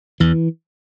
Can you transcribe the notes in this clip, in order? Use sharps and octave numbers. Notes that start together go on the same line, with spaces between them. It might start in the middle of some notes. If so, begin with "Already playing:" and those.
E2 E3